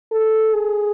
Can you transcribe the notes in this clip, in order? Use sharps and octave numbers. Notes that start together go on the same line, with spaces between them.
A4
G#4